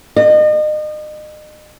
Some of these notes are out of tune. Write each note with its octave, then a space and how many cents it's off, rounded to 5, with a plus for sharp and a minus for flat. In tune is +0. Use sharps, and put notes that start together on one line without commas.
D#5 -35